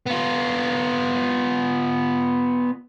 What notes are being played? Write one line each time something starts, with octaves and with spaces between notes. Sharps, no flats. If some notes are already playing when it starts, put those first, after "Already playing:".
B3 F4